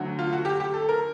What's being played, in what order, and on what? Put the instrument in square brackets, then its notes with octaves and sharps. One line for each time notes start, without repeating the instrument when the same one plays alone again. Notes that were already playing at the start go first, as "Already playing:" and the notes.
Already playing: [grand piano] D2 D3 F#3 F#4
F4
F#4
G4
G4
A4
A#4